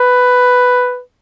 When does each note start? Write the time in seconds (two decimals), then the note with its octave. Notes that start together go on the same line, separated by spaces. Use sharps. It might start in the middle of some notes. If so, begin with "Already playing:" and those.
Already playing: B4